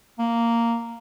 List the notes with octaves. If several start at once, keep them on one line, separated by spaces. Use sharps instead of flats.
A#3